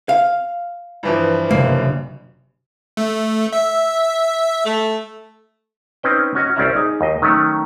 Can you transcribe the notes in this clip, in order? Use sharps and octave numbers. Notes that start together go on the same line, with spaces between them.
F5
G2 E3 F3
F#1 C3 A#3
A3
E5
A3
C4 C#4 D#4 B4 C5 G5
C#4 F#4 D#5
C2 C4 C#4 D5 E5 A#5
D#4 G#4 G#5
D#2 D#5
D#3 F#3 A3 C#4